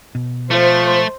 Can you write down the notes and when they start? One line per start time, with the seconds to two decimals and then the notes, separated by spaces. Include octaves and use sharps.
0.15 B2
0.51 F3 A3 C5